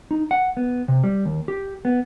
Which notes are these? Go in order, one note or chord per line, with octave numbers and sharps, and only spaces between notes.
D#4
F#5
B3
C3
G3
D#2
G4
B3